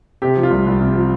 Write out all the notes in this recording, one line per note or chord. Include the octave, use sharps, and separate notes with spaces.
C3 G4
F3
F4
C2
C2
C3
F3